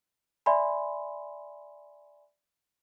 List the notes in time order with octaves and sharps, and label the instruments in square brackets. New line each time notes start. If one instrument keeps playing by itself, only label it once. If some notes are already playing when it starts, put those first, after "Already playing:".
[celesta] D5 E5 G#5 B5 C6